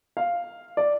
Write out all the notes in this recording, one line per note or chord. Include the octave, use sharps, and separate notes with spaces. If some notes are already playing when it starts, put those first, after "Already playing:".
F5
D5